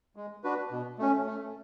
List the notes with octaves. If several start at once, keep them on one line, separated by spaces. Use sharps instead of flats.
G#3
D4 F#4 B4
B2
A3 C#4
A3